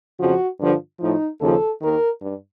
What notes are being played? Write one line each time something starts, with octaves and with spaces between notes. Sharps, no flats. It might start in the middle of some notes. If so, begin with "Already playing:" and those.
F2 C#3 F3 F#4
G2 D3 F3
A2 F3 D#4
D#2 C#3 F3 A4
D#2 D#3 A#4
G2